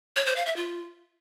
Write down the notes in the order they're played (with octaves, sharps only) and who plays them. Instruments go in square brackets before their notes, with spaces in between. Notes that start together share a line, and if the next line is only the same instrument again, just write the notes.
[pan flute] C#5
C5
F5
E5
F4